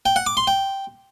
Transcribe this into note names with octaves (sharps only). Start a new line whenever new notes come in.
G5
F#5
D6
C6
G5